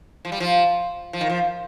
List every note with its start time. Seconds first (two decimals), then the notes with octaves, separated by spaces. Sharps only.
0.25 F3
0.32 G3
0.40 F3
1.13 F3
1.21 D#3
1.30 F3